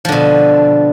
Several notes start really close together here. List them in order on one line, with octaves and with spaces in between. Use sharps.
F3 D3 B2